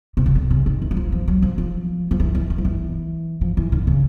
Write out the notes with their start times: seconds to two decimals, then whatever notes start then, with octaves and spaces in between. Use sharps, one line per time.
0.17 C3
0.26 C#3
0.35 D3
0.50 C#3
0.66 D#3
0.82 E3
0.91 F#3
0.97 F3
1.12 F3
1.28 F#3
1.42 F3
1.58 F3
2.11 F3
2.20 E3
2.35 E3
2.50 E3
2.58 F3
2.65 E3
3.41 F3
3.57 E3
3.72 D3
3.87 C#3